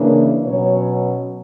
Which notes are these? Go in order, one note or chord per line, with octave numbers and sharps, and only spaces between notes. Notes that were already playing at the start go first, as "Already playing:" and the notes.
Already playing: C#3 E3 A#3 D4
B2 F#3 C#4 C#5